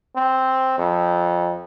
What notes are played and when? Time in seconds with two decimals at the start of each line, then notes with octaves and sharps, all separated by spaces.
0.16 C4
0.78 F2